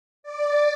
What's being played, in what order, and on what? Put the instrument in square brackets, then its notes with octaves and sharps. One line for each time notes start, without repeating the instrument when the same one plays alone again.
[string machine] D5